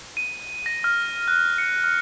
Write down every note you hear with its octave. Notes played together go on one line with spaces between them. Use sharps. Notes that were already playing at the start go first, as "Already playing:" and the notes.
D#7
A#6
F6
F#6
C#7
F6